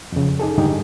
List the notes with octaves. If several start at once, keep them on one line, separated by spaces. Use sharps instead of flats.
F2 C#3
D#4 G#4 A4
C#2 G2 D3 D#4 G4